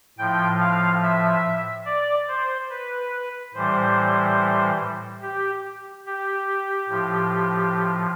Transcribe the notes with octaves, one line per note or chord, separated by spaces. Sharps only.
A2 F3 G5
F5
E5
D5
C5
B4
A2 E3 G3 C5
G4
G4
A2 F3